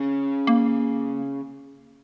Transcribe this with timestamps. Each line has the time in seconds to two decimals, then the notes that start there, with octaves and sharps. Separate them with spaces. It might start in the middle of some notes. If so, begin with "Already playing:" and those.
Already playing: C#3
0.47 A#3